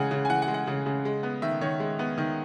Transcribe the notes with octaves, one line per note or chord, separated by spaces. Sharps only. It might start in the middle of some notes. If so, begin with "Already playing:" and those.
Already playing: C#3 E3 G#3 F#5 G#5
C#3
G#5
E3 F#5
F#5
G#3
F#5
C#3
C#3
G#3
B3
D#3 E5
D#3 C#5
G#3
B3
D#3